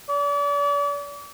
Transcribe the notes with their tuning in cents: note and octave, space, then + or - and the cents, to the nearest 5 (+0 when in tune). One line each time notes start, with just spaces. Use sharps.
D5 -40